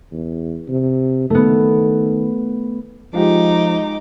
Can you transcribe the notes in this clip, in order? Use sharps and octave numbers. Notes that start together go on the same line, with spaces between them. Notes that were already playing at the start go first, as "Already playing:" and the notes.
E2
C3
D#3 A3 B3
F3 G#3 D#4 F4 G4 D6